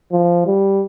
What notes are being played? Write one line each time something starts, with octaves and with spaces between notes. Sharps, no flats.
F3
G3